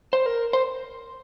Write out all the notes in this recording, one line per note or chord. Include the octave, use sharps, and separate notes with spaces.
C5
A#4
C5